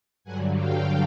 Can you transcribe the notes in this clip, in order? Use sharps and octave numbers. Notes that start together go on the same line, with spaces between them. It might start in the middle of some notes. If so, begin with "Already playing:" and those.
G2 D3 F#3 F#5 G#5
F5 G5